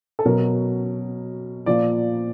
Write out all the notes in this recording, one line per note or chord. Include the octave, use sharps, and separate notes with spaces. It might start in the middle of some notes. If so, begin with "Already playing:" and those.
A4
B2 F#3 A#4
A#2 F3 D5